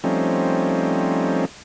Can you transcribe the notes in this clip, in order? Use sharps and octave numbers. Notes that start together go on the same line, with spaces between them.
F3 G3 A3 C4 C#4 D#4